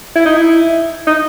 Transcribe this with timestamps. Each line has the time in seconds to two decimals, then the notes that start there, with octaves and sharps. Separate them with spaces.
0.16 E4
0.26 D#4
0.37 E4
1.07 D#4